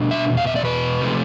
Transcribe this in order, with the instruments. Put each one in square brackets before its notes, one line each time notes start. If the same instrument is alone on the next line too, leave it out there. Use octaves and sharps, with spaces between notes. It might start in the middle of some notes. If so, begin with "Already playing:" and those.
Already playing: [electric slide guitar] B2 G3 D4
E5
E2 B2
F5
E5
D5
B4
C3 F3 A3